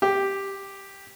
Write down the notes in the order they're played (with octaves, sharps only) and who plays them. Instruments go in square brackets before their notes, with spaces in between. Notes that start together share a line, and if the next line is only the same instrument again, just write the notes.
[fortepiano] G4